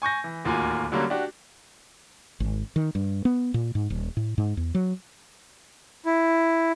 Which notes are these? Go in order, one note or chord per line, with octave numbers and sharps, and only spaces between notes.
G#5 C#6 G6 A#6
E3
D1 D#2 A#3 F4 F#4 G#5
D3 F#3 G3 A#3 C#4
D4 F#4 G4
G#1
D#3
G2
B3
A#2
G#2
D#1
A2
G#2
E2
F#3
E4